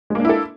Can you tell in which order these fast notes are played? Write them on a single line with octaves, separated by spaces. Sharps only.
G#3 A#3 D4 E4 A4